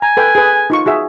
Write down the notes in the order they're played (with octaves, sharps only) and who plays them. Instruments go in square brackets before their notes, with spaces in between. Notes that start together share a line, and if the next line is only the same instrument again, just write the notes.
[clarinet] G#5 [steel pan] A#5
[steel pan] A4 B4 G5
G#4 B4
D#4 F4 C#6
F#4 G#4 E5